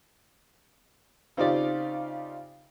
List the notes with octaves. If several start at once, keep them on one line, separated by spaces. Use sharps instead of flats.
C#3 C4 D#4 F4 G4 D5